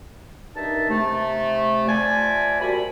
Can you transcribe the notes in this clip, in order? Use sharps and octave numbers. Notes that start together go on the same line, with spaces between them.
G2 D#3 D#4 E5 A5
C3 A3
F4 C5 D5 E5 G#5 A5
A#2 G3 F#4 B5